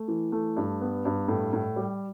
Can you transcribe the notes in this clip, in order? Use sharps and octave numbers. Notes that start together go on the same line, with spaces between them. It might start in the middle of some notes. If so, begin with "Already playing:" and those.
Already playing: A3
E3
A3
G2
B3
G2
A2
A2
G3